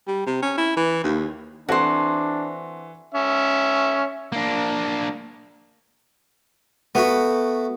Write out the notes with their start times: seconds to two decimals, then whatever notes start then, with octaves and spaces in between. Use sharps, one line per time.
0.07 G3
0.26 C3
0.42 C#4
0.57 E4
0.77 E3
1.04 D#2
1.69 E3 C4 D4 F#4 A4 C5
3.14 C#4 E5
4.32 A#3 D4
6.95 A3 B3 F#4 B5